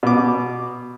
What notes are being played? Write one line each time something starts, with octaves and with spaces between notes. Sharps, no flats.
B2 D6